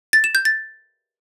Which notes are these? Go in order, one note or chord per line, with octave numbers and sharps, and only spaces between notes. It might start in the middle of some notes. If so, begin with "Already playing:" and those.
A6
E7
G6
A6